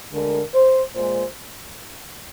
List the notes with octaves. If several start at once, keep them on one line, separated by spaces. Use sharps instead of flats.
D2 D3 G#3 A#4
C5
A#2 G#3 C5